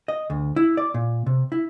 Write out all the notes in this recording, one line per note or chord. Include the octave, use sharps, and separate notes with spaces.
D#5
D2
E4
D5
A#2
C3
E4